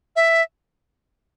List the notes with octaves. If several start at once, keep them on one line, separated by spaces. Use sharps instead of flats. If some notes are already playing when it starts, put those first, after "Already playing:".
E5